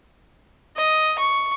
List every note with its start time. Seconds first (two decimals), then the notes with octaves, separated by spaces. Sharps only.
0.77 D#5
1.19 C#6